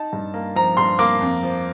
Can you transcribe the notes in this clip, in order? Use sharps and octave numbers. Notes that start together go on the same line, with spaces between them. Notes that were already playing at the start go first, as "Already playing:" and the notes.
Already playing: D#4 A5
G2
A#3
F3 A#5
G2 C6
A#3 D6
F2
F3